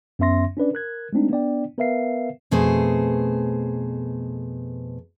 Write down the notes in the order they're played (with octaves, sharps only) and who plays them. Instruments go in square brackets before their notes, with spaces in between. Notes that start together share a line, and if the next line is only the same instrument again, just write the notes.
[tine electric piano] F#2 B3 C#4 E5 C6 A#6
C#4 D4 B4 D5
A#4 F#6 G#6
G#3 A3 C4 D4 D#4
B3 D4 D5 G5
B3 A#4 B4 E5 F5 C7
[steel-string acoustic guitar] F2 B2 A3 G#4 C5